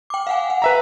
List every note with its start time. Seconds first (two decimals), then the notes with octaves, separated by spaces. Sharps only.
0.10 G5 D6
0.27 F5 F#5 G#5
0.50 F#5
0.62 B4 E5 A#5